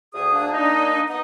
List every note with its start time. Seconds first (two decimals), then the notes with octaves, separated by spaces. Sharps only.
0.13 D2 G#4 D#6
0.32 A#3 D4
0.52 D#4
1.08 B3 D#4 D#5